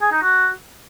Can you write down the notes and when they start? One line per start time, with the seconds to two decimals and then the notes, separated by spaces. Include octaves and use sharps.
0.01 G#4
0.12 D#4
0.22 F#4